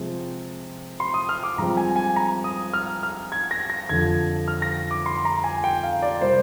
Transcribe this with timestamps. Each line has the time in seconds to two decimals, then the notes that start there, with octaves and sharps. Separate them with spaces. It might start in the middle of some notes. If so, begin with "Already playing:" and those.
Already playing: C3 F3 G#3 C4
1.00 C6
1.14 D#6
1.29 F6
1.43 D6
1.58 G2 F3 G#3 C4 A#5
1.77 G#5
1.96 G#5
2.16 A#5
2.44 D#6
2.73 F6
3.03 F6
3.32 G#6
3.51 A#6
3.70 A#6
3.89 F2 D3 F3 G#6
4.48 F6
4.62 A#6
4.91 D6
5.06 C6
5.25 A#5
5.44 G#5
5.64 G5
5.83 F5
6.02 D5
6.21 C3 G3 A#3 C5